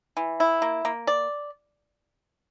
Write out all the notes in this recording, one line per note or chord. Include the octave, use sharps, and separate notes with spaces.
E3
E4
A#3
A#3
D5